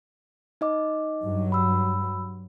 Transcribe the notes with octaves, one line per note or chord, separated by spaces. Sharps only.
D#4 D#5 D6
G2 F#3
B5 E6